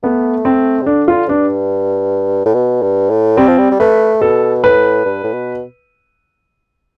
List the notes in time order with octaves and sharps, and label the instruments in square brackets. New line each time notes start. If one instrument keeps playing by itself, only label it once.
[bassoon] A3 [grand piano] B3
[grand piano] C4
[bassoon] C3
[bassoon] D3 [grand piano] D4
[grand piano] F4
[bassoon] G2 [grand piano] D4
[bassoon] A2
B2
G2
A2
[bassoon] G3 [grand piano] C4
[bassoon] F3
G3
G3
[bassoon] A3 [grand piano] B4
[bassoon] B2 [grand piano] A4
[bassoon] A2 [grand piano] B4
[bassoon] G2
A2
B2